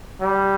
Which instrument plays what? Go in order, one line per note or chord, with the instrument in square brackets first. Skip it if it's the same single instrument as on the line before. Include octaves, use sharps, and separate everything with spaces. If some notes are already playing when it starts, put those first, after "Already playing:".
[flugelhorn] G3